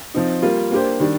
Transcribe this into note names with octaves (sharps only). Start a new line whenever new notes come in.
F3 C4 D#4
G3 A#3 F4
A#3 D4 G4 C5
D#3 G3 D4